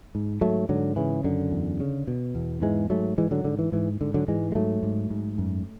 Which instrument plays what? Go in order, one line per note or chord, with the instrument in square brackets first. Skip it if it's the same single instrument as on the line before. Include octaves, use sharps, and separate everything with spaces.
[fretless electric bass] G#2
G#2 F#3 A3
G#2 D3 F#3
C#3 E3
F#2 D3
E2
C#3
B2
E2
G#2 E3 G#3
G#2 F#3 A3
G#2 E3 G#3
D3 F#3
G#2 D3
E3
G#2 E3
G#2 D3
D3 F#3
G#2 E3 G#3
G#3
G#2 F#3 A3
G#2
G#2
F#2